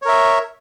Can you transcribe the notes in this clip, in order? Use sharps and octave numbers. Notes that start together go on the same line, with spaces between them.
A#4 C#5 E5